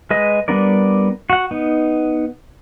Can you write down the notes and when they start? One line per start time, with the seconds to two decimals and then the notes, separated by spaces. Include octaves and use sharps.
0.11 G#3 B4 D#5
0.48 G3 B3 D4 A#4 D5
1.30 F#4 F#5
1.51 B3 D#4